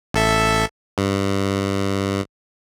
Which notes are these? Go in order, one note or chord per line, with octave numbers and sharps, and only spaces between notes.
A1 A4 E5
G2